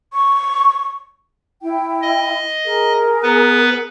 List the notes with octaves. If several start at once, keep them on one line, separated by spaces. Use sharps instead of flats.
C#6
E4 G5
D#5
G#4 A#4
B3 B4